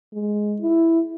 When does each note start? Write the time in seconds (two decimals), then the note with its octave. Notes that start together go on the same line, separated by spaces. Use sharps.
0.13 G#3
0.61 E4